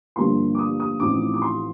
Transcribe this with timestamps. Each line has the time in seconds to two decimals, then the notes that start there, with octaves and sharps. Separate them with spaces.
0.16 G2 D3 F3 A#3 C6
0.55 D6
0.59 D#6
0.80 D#6
1.00 A1 A2 F3 C4 D#4 D6
1.34 D6
1.42 C6